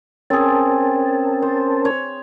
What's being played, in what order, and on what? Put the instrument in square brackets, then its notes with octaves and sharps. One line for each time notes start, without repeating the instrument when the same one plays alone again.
[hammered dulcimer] C4 G#4 [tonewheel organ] C#4 A#4 A5
[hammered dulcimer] C5
C#5